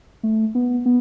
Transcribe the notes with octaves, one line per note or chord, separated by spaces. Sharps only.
A3
B3
B3